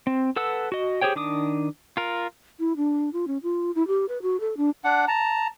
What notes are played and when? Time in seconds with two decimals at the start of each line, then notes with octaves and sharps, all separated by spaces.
0.07 C4
0.36 A4 B4 F#5 E6
0.72 F#4 D#5
1.01 G4 G#4 C5 C#5 G5
1.16 D#3 D4 D6 D#6
1.97 F4 A#4
2.60 E4
2.77 D4
3.13 F4
3.27 C#4
3.43 F4
3.75 E4
3.87 G4
4.09 B4
4.22 F#4
4.40 A4
4.57 D4
4.84 D4 F#5
5.08 A5 A#5